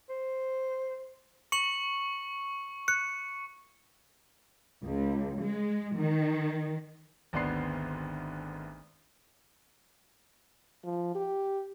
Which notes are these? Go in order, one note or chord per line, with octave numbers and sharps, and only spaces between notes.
C5
C#6 C#7 F#7
F#6 C#7
C#2
G#3
D#3
G#1 D2 B3 D4 C6 C7
F3
G4